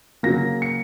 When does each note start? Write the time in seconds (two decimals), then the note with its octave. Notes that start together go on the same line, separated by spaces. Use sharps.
0.23 C#3 F#3 A#3 A#6
0.62 C#7